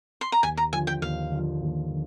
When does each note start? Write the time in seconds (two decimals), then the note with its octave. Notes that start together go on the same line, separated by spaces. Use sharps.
0.21 C6
0.32 A#5
0.43 D#2 G#5
0.57 A#5
0.73 D3 F3 G#5
0.87 G5
1.02 D#2 F5
1.32 D3 F3
1.61 D#2
1.91 D3